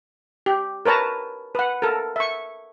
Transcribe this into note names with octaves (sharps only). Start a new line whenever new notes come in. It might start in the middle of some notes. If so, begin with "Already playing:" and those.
G4
A#4 B4 C#5 A5 A#5
B4 F#5
A4 A#4
E5 C#6